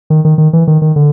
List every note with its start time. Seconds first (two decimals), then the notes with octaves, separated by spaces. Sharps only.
0.10 D#3
0.25 D#3
0.38 D#3
0.53 E3
0.67 D#3
0.82 D#3
0.96 D3